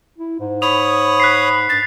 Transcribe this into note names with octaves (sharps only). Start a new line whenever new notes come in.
E4
G#2
C#5 B5 D#6 F7
F#6 B6 C7
G2 A6